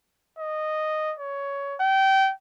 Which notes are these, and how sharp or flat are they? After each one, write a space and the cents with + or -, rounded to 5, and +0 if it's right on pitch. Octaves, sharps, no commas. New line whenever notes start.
D#5 -10
C#5 +15
G5 -25